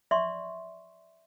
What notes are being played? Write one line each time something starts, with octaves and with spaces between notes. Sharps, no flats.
D5 E5 C6 C#6